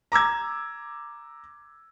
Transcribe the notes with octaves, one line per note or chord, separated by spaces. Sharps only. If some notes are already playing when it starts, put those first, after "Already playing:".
A#5 D6 E6 G#6